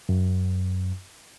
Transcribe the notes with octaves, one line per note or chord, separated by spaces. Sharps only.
F#2